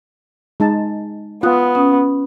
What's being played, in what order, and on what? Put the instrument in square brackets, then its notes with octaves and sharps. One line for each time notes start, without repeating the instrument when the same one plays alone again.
[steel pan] G#3 D#4 A5
[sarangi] B3 [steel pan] F4 [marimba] D#6 F#6
[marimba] C#4 D#6